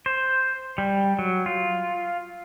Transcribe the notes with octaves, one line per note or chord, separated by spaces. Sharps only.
C5
G3
F#3
F4